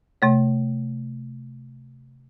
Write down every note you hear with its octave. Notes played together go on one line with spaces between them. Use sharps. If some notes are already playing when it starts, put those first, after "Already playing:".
C3 A3 C#5